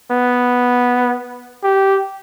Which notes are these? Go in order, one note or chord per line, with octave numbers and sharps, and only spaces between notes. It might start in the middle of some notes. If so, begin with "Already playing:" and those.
B3
G4